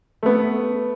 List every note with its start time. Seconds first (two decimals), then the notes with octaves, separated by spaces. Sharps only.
0.23 A3 B3